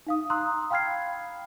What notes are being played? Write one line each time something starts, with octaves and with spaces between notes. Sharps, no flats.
D#4 F5 D#6
A#5 C6 D#6 E6 F#6
F5 G5 B5 F6 G#6 C7